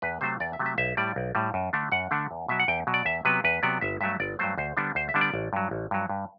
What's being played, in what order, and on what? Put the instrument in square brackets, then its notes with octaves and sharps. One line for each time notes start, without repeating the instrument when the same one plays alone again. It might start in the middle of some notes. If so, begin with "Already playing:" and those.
[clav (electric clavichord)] E2 B4
C3 F#3 A3 C5
E2 D5
E5
C3 F#3 A3
E5
B1 E5
A2 G3 D5
B1
A2 G3
F#2
D3 A3 D4
F#2 F#5
D3 A3 D4
E2
B2 F#3 E5
F#5
E2 G5
B2 F#3
D5
E2 E5
C3 F#3 B3 B4
E2 B4
C3 F#3 B3 D5
G1 E5
G2 F#3 A3 E5
G1 D5
G2 F#3 A3 C5
D2 C5
D3 G3 B3 D4
D2 C5
E5
D3 G3 B3 D4
D5
A1
G2 F#3
A1
G2 F#3
G2